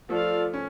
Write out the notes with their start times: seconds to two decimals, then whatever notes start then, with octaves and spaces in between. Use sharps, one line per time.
0.09 F3 A3 F4 A4 D5 F5
0.54 C#4